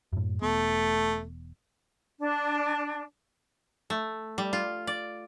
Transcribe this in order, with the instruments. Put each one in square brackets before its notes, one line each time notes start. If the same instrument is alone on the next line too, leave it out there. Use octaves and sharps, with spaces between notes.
[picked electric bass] F#2 A2
[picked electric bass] E1 B3 [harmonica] A3
[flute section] D4
[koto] A3
G3
F4
D5